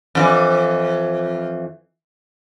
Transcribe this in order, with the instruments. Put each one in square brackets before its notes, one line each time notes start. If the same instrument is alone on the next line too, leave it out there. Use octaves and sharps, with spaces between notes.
[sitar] F2 D3 E3